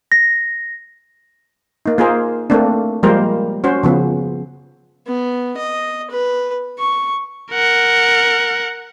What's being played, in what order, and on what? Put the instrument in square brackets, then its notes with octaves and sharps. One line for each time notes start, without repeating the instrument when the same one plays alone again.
[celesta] A#6
[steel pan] A#3 D#4
A#3 F4 G#4 A#4 C5
A3 A#3 C4 D4
F3 G3 G#3 A#3 A#4 C5
C#4 F#4 C5
C#3 F3 B3
[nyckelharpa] B3
D#5
B4
C#6
[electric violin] A#4 F#5